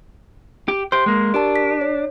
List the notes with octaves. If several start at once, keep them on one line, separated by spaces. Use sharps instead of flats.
G4
G4 C5 C6
G#3 A#3
D4 G4 A#4 A5
B6
C#5